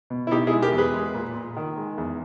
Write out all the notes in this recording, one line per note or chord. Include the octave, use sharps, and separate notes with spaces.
B2
E4
B2 D#4 G4
E4 G#4
G#3
G4 A#4
E2
G#4 B4
G#3
A#2
A#2
D#3
G#3
E2